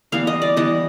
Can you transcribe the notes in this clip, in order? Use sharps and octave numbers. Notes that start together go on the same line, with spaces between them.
E3 G3 B3 F5
D#5
D5
E3 G3 B3 D#5